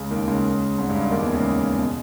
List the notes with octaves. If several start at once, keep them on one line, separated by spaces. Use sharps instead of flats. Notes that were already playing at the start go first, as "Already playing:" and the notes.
Already playing: C#2 C#3
D#2 D#3
C#2 C#3
G#1 G#2
G2
D#2 D#3
E2 E3
C#2 C#3
B2